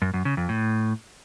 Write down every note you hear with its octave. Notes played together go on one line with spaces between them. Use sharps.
F#2
F#2
C#3
F2
A2